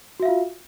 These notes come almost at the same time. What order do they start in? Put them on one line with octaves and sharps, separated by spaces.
F#4 E5 F5 F4